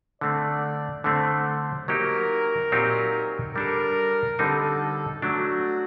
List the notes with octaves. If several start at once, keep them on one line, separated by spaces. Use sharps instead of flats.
D3 A3 C4 D5
D3 A3 C4 C5
F#3 A#3 D#4 G4 A#4
A#2 F#3 C4 D#4 G4
G3 D4 A4 A#4
D3 G3 C4 D#4 A4
F#3 A3 D4 F#4